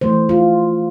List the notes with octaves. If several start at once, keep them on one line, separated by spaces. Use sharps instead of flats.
E3 A3 C5
F4